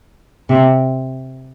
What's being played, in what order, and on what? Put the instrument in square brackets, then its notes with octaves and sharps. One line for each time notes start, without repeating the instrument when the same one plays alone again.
[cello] C3